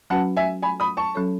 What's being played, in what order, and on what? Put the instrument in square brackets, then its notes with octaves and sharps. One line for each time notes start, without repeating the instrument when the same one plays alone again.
[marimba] F#3 C#4 F#4 B4 [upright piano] F#5 A5
[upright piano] E5 G#5
G#5 B5
B5 D#6
A5 C#6
[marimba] F#3 C#4 F#4 A4 C#5